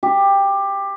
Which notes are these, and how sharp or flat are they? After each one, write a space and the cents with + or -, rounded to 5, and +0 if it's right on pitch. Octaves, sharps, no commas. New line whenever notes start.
G4 +15